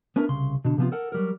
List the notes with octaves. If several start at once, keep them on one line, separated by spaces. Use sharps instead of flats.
B3 C#4 D4 E4 A#4
C2 C#3 C6
B2 D3
C3 F3 A3 B3 C4 F4
A4 A#4 F#5
F#3 G3 A#4